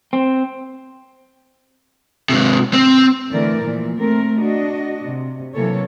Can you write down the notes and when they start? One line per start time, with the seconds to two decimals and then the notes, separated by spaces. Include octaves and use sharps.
0.13 C4
2.29 G#2 C3
2.73 C4
3.32 D3 E3 A3 A#4 D5
3.61 A#2 E3 F3
3.98 A3 C4 A#4
4.39 D4 F#4 D#5
5.03 C3
5.54 C3 E3 F#3 A#3 A4 C#5